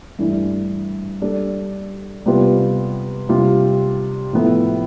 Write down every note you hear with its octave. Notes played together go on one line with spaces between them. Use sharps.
G2 E3 A3 D4
G3 D4 A4
C3 G3 B3 F4 B4
C3 G3 D4 F4
A2 F3 B3 E4 A4